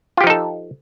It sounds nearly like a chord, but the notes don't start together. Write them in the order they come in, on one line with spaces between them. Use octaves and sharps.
F4 G4 F3 D#4 A4